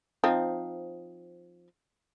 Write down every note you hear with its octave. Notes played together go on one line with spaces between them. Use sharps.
F3 C4 D#4